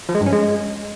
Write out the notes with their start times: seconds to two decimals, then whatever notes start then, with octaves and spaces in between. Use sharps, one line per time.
0.09 F3
0.15 G#3
0.21 G2
0.26 C#4
0.32 G#3